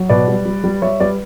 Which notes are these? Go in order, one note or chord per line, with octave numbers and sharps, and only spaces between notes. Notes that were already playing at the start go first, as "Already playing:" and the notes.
Already playing: F#3
B2 B4 D5
G3
G3
G3
G3 C#5 E5
G3 B4 D5